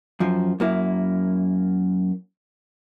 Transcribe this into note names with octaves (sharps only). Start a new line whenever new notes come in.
F#2 F3
F#2 A#3 E4